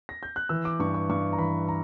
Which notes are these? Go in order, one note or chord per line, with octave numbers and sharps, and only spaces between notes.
A#6
G6
F#6
E3 E6
D6
G2 C#6
C#6
G2 C#6
A#5
E3 B5
A#5